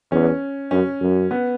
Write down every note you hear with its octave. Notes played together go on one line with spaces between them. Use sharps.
E2 C#4
F#2 C#4
F#2
B3